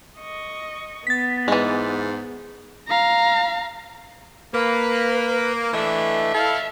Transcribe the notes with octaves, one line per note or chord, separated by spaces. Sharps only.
D#5 C#6
B3 A6 B6
G#2 E3 G#3
F5 A#5
A#3 B4
E3 A3 D4 D#5 E5
E4 A4 F5